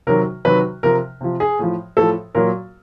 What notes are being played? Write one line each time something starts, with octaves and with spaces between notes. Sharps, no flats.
C3 D#3 F#3 A#4
C3 D#3 F#3 B4
C3 F3 A#4
C3 F3
G#4
A2 F3
A2 F3 A4
A#2 F#3 A#4